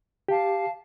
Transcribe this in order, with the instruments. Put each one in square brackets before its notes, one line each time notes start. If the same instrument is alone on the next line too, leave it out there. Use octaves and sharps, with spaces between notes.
[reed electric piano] G4 [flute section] F5 A5